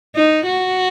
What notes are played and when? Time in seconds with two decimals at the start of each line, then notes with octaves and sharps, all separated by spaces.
0.16 D#4
0.46 F#4